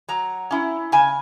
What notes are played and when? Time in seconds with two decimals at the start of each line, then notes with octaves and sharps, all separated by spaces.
0.08 F#3 A#5
0.51 C#4 E4
0.92 C#3 G#5